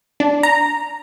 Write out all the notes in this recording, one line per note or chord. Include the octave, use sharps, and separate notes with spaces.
D4
A#5